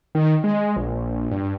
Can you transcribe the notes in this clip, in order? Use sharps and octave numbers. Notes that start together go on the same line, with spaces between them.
D#3
G#3
A#1
G2